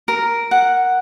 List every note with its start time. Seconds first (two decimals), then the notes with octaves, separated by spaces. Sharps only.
0.08 A#4
0.51 F#5